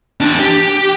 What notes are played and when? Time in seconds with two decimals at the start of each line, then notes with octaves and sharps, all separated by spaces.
0.20 E2 D4
0.39 G4